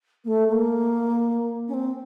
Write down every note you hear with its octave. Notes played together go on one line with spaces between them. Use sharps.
A#3
A3
A3
A#3
C#4
C4